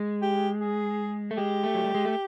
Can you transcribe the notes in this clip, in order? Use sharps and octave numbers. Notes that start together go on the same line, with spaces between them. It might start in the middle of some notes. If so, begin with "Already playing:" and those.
Already playing: G#3
G4
G#4
A3
G#3 G4
A3
F#3
G3
G#3
A3